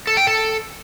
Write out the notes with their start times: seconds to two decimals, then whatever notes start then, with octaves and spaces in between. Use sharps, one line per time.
0.07 A4
0.17 G5
0.27 A4